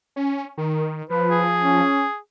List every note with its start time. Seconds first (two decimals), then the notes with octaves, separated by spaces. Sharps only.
0.16 C#4
0.57 D#3
1.09 F3 B4
1.31 G#4
1.59 C#4